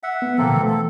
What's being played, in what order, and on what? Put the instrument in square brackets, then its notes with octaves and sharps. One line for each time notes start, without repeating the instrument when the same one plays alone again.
[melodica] E5 F#5
[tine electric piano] B3
[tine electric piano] B2 D3 F3 [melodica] A#3 C4 A4
[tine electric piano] E3 A3
[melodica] A4